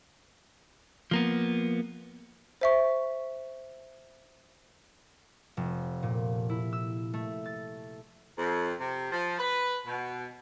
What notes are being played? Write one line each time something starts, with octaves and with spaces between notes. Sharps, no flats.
F3 A#3 B3
C5 E5 C#6
F1
A#2
E4
E6
A3
A6
F2
C3
F3
B4
B2